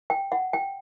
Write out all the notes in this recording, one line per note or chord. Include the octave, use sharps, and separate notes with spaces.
G5
F#5
G5